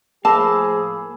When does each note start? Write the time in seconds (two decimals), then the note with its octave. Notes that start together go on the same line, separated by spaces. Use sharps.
0.25 A2 F3 A#3 G#4 A5 B5 D6 E6